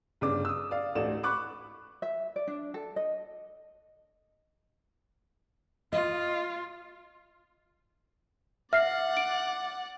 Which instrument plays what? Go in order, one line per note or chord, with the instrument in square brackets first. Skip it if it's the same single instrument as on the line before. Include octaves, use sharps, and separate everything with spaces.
[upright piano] G1 C#3 D4 D6
D#6 E6
D5 F5
A1 D2 A2 A4 D5 E7
B5 C#6 D6 F#6
[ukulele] E5
D5
D4
A4
D#5
[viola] F4 [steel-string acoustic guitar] D#5
[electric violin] D5 F#5 [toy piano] E5 [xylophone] F6 C7
[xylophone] D7